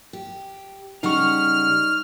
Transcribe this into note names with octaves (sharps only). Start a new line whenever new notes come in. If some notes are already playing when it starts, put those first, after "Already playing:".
G4
C#3 G3 D#4 F#5 C#6 F6